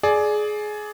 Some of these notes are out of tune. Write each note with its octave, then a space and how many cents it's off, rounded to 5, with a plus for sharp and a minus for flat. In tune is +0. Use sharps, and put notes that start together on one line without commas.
G#4 +20 D5 +0